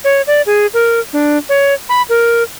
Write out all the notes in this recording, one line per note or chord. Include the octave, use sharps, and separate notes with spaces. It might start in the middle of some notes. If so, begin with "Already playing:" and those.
C#5
D5
G#4
A#4
D4
C#5
B5
A#4